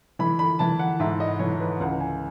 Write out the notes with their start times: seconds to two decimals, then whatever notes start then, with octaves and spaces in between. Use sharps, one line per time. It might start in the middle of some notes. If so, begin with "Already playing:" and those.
0.19 E3 B5
0.39 B5
0.59 E3 A5
0.79 F#5
1.00 G#2 E5
1.20 D#5
1.39 E3 C#5
1.60 B4
1.80 C#2 F#5
2.00 G#5